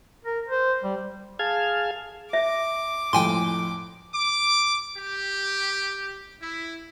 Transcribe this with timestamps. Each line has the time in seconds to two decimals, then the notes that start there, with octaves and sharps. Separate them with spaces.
0.25 A#4
0.48 C5
0.83 G3
1.39 G#4 F5 A5 F6 G#6
2.33 E5 D6
3.13 F2 A2 G5 G#5 C6
4.15 D6
4.97 G4
6.42 E4